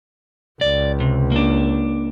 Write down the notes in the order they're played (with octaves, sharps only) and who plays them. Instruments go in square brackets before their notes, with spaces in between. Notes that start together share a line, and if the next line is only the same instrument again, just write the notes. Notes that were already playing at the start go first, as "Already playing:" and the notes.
[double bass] C#2 [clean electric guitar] D5
[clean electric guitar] C3
A#3 D4